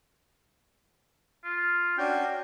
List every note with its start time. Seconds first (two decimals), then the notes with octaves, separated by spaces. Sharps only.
1.44 F4
1.98 C#4 D4 F#4 G5